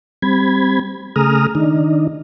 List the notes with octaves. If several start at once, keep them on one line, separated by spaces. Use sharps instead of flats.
G3 C4 B5 G#6
C#3 A3 G#4 A#5 D#6 F6
D#3 D4 D#4